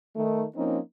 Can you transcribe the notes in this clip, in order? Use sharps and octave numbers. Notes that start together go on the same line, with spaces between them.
D#3 A3
F3 A#3 C4 C#4 D#4